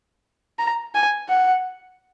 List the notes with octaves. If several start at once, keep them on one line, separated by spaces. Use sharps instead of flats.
A#5
G#5
F#5